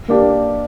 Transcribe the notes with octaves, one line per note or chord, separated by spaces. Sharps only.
A#3 D4 G4